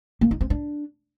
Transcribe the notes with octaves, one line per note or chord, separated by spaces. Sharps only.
A#3
D#4
C4
D4